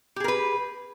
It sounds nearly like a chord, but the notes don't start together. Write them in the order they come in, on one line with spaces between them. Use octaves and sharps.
G4 G#4 A#4 B4